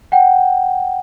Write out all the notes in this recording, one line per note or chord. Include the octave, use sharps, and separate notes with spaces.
F#5 G5